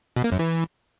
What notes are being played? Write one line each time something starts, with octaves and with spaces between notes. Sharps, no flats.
B2
A#3
F#2
E3